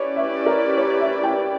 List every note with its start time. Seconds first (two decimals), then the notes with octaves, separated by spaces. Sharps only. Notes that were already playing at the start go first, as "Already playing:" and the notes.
Already playing: C#4 E4 G4 B4 C#5 D5
0.16 E5
0.46 A#4
0.77 C#5
1.00 E5
1.24 G5